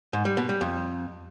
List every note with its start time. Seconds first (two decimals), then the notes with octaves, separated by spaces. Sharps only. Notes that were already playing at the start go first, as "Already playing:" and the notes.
0.13 G#2
0.25 G3
0.37 B2
0.49 G3
0.61 F2